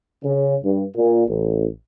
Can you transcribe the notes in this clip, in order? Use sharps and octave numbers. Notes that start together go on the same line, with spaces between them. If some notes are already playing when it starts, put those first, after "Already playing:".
C#3
G2
A#2
A1